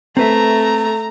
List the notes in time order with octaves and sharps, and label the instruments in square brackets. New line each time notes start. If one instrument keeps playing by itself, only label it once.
[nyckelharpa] A3 [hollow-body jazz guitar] C4 B4 E5 [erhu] A#5